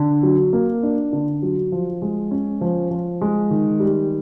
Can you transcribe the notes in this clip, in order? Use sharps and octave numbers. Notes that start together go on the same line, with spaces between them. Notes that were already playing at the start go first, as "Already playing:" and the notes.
Already playing: D3
F#3
A#3
D4
D3
F#3
F3
G#3
C#4
F3
F3
G#3
D#3
G3